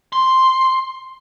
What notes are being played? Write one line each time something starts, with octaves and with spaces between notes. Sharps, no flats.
C6